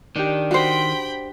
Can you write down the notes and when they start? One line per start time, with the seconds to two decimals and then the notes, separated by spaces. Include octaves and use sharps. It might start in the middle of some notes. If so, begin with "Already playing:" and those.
0.16 D#3 D4 G4
0.51 F#4 C5 G5 B5